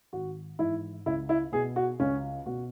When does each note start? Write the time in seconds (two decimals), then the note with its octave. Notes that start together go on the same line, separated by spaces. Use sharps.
0.13 G#1 F#4
0.59 G#2 E3 E4
1.06 C#2 E4
1.29 E4
1.52 B2 G#4
1.76 F#4
2.00 C#2 C#4
2.46 B2 F#4